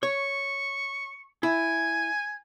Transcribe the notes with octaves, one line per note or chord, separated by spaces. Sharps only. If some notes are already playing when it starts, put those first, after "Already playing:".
C#5 C#6
E4 G#5